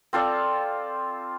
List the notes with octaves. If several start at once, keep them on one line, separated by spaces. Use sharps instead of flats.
C4 F4 A4 D5